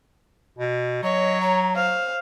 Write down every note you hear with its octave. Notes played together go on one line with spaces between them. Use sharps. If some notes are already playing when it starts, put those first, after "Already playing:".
B2
F#3 C#5 D#5
A#5
C5 F5